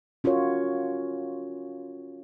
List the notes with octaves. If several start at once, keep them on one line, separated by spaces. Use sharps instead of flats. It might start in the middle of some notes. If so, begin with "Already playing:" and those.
C#4 F4 F#4 A#4 C#5